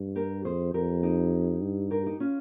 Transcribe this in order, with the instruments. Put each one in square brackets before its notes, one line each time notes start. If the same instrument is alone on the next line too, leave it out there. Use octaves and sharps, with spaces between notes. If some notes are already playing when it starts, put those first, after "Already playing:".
Already playing: [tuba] G2
[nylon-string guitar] G4 A#4
[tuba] F2 [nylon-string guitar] G#4 C5
[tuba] F2 [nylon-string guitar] G4 A#4
[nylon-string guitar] D#4 G4
[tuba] G2
[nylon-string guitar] G4 A#4
D#4 G4
C#4 F4